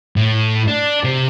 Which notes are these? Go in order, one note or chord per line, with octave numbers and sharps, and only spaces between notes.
A2
D4
C3